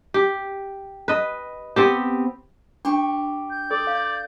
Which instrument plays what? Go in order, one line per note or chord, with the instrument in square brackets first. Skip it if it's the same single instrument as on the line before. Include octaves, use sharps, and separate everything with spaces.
[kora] G4
B4 D#5
B3 C4 G4
[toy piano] D4 [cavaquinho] G4 C5 C#6
[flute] G6
[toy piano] A4 [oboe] D5
[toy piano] F5